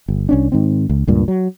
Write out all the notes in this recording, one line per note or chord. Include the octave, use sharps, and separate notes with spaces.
G1
C2 C#4 D4
G#2 D#3 C4
C#2
C#2 G2 A#2
F#3